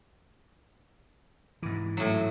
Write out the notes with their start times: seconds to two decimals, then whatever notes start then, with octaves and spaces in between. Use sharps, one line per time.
1.63 G#2 E3
1.97 A2 F#3